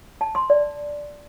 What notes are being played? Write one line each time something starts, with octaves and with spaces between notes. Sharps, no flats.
A5
C6
D5